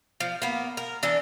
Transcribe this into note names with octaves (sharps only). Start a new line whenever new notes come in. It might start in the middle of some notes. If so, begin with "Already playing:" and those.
F3
A#3 B3
A#4
E3 D4 A4